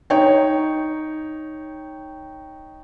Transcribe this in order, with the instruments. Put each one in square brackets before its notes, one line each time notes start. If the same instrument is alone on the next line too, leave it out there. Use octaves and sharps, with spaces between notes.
[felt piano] D#4 C#5 G5